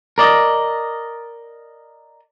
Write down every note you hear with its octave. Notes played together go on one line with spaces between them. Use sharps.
A#4 D5 D#5